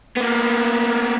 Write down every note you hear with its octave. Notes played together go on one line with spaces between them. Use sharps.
A#3 B3